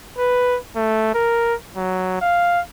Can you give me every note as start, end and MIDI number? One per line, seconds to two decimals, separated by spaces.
0.18 0.58 71
0.76 1.13 57
1.15 1.54 70
1.77 2.19 54
2.21 2.60 77